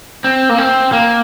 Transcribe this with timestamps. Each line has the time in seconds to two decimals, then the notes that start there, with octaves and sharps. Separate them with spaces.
0.24 C4
0.49 A#3
0.58 C4
0.92 A#3